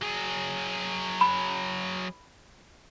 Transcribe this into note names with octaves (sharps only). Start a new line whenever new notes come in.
F#3 G#4
B5